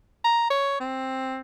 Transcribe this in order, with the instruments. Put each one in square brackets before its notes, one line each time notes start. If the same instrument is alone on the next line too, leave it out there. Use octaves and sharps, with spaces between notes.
[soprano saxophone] A#5
C#5
C4